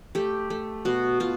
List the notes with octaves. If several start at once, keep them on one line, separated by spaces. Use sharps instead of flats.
A3 G4
A3
B2 F#4
B2 F4